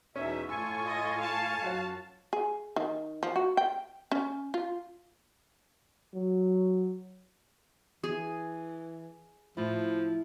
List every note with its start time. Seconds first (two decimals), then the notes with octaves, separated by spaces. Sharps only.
0.16 E2 B2 C#4 D#4 E5
0.49 A2 F4 A4 G#5 C#6 E6
0.88 D#5
1.20 F5 A5
1.62 F#2 F4 F#4 C#5
2.33 G#4
2.76 D#3
3.23 F3
3.36 F#4
3.57 G5
4.12 C#4
4.54 F4
6.14 F#3
8.04 E3 G#4
9.57 A2 F3 E4